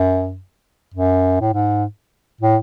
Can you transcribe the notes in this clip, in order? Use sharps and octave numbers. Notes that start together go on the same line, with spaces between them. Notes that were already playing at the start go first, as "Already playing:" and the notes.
Already playing: F#2
F#2
A2
G#2
A2